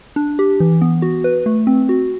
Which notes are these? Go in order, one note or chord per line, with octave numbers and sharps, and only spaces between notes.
D4
G4
E3
B3
F#4
B4
A3
C4
F#4